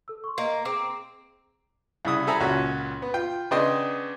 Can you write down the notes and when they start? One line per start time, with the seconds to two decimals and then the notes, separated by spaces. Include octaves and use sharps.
0.08 A4 E6
0.24 C6 C#6
0.38 A#3 D#5
0.65 C4 G#4 A#5 D6
2.05 C2 C#3 E4 E5 D#6
2.27 C4 A4 E5 G#5 A#5 B5
2.40 C#2 A#2 C#4 F#4
3.02 B3
3.14 F4 G5
3.51 C#3 B3 D4 D#5 G5 C6